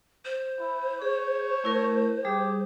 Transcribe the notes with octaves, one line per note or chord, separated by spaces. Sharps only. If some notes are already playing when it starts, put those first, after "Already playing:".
C5
E4
G#4 C#5
A3 E4 A#4
G3 G4 G#4 D#6